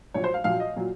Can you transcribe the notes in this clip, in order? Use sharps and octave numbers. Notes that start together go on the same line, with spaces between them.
A#1 A#2 F#3 C#5
C5
F5
A#1 A#2 F#3 F5
D#5
A#2 F#3